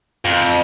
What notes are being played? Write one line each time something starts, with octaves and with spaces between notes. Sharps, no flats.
F2